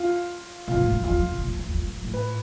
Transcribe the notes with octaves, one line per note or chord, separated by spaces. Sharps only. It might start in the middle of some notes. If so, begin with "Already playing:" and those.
Already playing: F4
B2 F4
A#2
G#2
F#2
E2 F4
F2
C3
A#2
E2
F2
E2
F2
F#2
G2
A2
B4